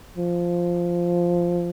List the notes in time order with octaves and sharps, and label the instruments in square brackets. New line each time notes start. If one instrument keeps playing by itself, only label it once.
[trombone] F3